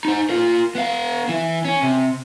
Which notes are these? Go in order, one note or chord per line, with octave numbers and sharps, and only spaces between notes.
D#4 C5
F4 A#4
B3 F5
E3 E4
C#4
C3